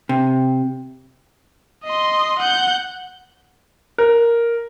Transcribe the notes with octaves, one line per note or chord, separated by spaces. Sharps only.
C3
D#5 C6
F#5 G6
A#4